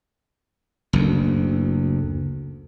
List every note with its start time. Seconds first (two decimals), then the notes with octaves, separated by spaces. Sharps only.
0.93 F#1 D2